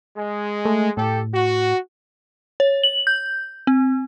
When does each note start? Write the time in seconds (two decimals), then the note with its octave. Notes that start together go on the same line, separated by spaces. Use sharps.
0.17 G#3
0.65 A3
0.97 A2 G4 A4
1.34 F#4
2.60 C#5
2.83 F#7
3.07 G6
3.67 C4